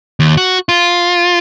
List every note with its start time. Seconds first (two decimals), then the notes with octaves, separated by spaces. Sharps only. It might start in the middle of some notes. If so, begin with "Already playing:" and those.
0.20 D#2
0.37 F#4
0.69 F4